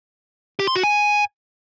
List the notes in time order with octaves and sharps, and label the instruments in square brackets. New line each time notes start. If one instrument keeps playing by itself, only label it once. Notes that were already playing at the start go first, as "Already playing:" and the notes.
[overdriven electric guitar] G4
C6
F#4
G#5